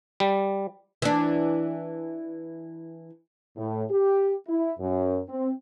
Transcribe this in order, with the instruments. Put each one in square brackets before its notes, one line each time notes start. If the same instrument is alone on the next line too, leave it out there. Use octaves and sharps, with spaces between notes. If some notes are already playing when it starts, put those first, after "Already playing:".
[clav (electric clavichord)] G3
[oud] E3 D4
[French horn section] A2
G4
E4
F#2
C4